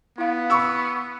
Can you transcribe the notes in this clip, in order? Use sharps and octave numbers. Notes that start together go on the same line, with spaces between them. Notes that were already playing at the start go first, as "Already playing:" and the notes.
B3 E4 F5
B5 C#6 E6